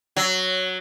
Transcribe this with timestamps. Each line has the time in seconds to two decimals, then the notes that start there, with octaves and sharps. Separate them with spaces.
0.16 F#3